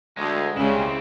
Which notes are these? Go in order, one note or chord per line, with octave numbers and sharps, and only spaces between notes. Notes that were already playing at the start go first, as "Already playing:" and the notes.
D2 G#3
C#2 C#3 G3 G#3 C4 C#4 E4